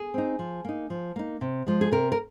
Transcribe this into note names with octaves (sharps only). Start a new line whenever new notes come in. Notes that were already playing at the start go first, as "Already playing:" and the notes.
Already playing: G#4
C4 D#4
F3
A#3 D#4
F3
A#3 D#4
C3
F3 G#3
G#4
C3 A#4
A#4